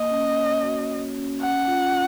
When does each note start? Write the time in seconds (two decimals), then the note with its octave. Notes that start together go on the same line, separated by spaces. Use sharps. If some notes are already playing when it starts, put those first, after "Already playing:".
Already playing: A#3 D#5
0.10 C#4
0.36 C#5
0.63 F#4
0.89 A#3
1.15 C#4
1.41 C#4 F#5
1.67 F4